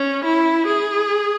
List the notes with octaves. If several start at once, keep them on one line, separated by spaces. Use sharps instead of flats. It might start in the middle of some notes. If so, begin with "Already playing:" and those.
Already playing: C#4
E4
G#4